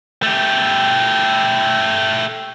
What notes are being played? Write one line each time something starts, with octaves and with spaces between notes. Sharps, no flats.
A3 G4